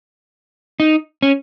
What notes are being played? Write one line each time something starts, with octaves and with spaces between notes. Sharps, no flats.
D#4
C#4